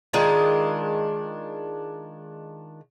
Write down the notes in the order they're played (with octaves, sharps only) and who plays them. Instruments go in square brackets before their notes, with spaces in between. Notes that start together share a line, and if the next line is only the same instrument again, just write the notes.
[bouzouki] D#3 G#3 D4 F4